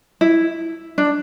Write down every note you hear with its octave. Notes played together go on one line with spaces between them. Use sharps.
E4
D4